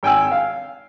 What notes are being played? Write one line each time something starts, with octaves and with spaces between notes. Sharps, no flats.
G#1 G5 G#5 E6
F5